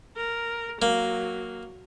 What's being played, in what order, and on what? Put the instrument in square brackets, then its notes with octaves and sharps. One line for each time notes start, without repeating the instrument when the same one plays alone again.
[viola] A#4
[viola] F#3 [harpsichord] A#3